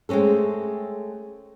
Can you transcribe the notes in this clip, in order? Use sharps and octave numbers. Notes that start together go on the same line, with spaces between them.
G#3 A3 C4 C#4 A4